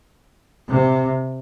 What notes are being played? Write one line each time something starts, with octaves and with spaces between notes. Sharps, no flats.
C3